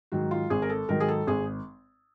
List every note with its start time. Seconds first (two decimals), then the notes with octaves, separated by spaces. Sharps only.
0.12 G#2 D#3 F#3 F#4
0.31 F4
0.50 G#1 G#4
0.62 A#4
0.70 A4
0.89 G#2 D#3 F#3 A#4
1.00 G#4
1.08 A4
1.27 G#1 G#4